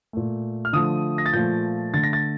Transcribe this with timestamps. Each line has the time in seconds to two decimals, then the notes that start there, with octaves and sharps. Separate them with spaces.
0.13 A#2 A3
0.65 F6
0.73 D3 F3 A3 D#6
1.18 A#6
1.26 A6
1.33 A#2 F3 A3 G6
1.94 D3 A3 A6
2.03 A#6
2.13 A6